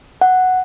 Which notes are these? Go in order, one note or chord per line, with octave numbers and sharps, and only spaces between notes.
F#5